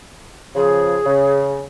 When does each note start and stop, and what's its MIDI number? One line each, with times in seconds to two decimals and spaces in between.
0.55 0.97 49
0.55 0.97 53
0.55 1.43 68
1.06 1.63 49